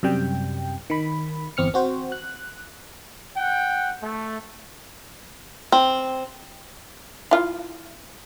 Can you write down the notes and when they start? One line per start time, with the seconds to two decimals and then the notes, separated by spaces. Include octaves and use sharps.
0.03 F#2 C3 G3 G5
0.90 D#3 B5
1.57 G1 E2 C4 F6 C#7
1.74 C4 F#4 C5
2.12 F#6
3.36 F#5 G5
4.01 A3
5.72 C4
7.31 E4 F4